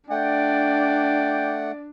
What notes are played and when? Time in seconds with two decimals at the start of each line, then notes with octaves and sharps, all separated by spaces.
0.10 A3 D4 D5 F#5 G5